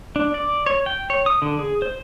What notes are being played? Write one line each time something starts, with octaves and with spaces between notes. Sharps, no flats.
D4
D5
C#5
G5
C#5
D#6
D3
G#4
C5